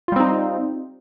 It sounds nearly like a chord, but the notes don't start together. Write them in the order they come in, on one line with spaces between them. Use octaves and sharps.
F4 G3 C4 D#4